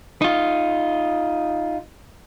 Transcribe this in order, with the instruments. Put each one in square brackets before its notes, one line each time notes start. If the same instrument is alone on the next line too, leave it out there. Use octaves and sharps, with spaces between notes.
[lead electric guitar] D#4 F4